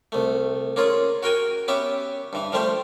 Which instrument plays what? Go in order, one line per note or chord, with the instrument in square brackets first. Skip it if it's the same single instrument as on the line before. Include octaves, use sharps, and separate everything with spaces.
[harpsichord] C2 A3
A#3 C#4 F4 G#4
F#4 A#4 G5 G#5
B3 C#4 G4 E5
G2 E3
F3 G3 A3 G4 C5